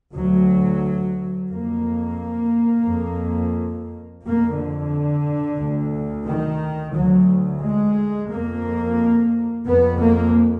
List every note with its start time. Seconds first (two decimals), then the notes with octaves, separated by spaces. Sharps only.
0.16 D2 F#3
1.52 F2 A#3
2.87 F2
4.23 F2 A#3
4.57 D3
5.59 D2
6.27 D#3
6.95 D2 F#3
7.62 G#3
8.31 F2 A#3
9.66 F2 B3
10.01 A#3